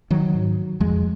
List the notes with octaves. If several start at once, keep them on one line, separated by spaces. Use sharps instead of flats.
D#3 F#3
G#2
F2 F3 G#3